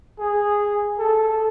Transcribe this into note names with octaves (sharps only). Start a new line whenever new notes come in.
G#4
A4